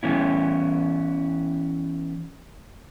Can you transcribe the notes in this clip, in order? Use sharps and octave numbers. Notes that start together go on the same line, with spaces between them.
E3 B3 C#4 E4